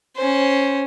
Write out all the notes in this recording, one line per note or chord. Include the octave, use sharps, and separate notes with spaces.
C#4 C5